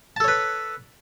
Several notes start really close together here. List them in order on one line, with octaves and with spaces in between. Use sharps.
A5 A4 C#5 B4